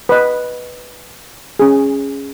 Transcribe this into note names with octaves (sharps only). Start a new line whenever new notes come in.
B4 D#5
C#4 G#4